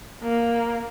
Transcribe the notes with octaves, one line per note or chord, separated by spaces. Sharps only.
A#3